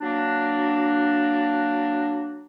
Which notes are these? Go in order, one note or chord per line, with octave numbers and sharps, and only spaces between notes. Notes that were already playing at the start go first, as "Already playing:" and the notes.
F#3 A#3 D4